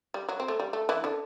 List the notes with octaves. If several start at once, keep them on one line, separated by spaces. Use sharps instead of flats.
G3
F#3
C4
A3
G3
A3
E3 E4
D3 D4